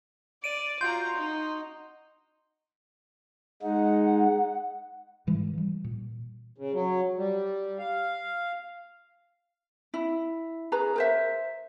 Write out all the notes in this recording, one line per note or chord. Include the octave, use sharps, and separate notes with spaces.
D5 D7 D#7
F4 F#4 A#5 C6 G6
D#4
G#3 D#4 F#5
G#2 E3 G3 G#3
E3 G3
A#2
C#3
F#3
G3
F5
E4
G#4 B4 A#5
A#4 C5 E5